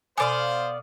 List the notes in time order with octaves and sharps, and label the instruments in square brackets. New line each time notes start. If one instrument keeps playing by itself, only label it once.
[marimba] B2 G#5 [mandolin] B3 D5 F5 [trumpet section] C5